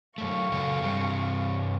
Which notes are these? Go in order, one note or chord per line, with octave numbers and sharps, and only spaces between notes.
F#2 A3 F5 C#6
C#3 F#3 A4
G2 C3 G3